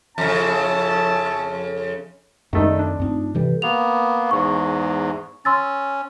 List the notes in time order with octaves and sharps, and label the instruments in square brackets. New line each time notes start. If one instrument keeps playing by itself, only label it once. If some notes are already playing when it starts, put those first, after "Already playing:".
[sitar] F2 C#3 [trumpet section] C#4 E4 A5
[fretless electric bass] F#2 [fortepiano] D#3 A3 D#4 [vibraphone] A4 D5
[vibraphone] C4 [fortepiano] D4
[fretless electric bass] G2 C4 [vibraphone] A3 D#4 F4
[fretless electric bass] C3 E3 G3 [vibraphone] G4 A4 B4
[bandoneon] A#3 B3 [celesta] F7
[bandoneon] E2 G#2 [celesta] C#6
[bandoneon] C#4 [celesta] C6 E6 A6